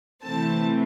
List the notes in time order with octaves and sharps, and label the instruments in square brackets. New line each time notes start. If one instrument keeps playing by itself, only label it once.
[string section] C3 E3 A3 C4 A5